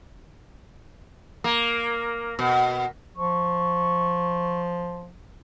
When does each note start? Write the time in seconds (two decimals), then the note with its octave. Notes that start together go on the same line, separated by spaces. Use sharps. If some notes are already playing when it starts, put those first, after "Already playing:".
1.44 A#3
2.39 B2
3.16 F3 C#6